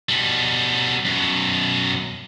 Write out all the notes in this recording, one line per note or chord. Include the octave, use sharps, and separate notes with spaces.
B2 G3
F#2 B2